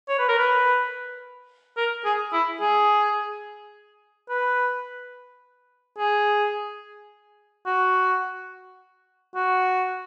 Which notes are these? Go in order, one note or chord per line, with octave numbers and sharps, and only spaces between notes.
C#5
B4
A#4
B4
A#4
G#4
E4
G#4
B4
G#4
F#4
F#4